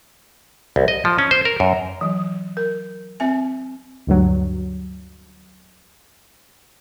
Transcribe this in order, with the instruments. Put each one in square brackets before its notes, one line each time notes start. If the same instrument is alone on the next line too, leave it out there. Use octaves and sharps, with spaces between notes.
[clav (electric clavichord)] C2
D#5
F3
C#4
C5
A#4
F#2
[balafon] E3 F#3
A#4
C4 E5 G#5
[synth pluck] D2 G2 F#3